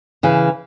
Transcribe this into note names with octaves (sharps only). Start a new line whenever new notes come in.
C#3 E3